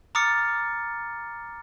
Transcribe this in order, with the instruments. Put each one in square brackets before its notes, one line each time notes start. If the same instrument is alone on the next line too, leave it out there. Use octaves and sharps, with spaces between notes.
[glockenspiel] A#5 D6 D#6 F6 A6 C#7